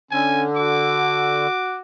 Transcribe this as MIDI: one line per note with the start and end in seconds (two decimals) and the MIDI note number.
0.11 1.47 50
0.11 0.46 61
0.11 0.44 80
0.56 1.82 66
0.56 1.79 86